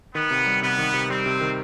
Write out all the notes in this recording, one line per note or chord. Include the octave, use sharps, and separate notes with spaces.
D#3 B3
C3
G3
C3 B3
D#3
C3
G3 C4
C3
D#3